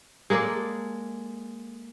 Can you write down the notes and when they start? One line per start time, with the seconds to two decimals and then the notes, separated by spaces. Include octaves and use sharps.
0.30 G#3 A#3 A4 D5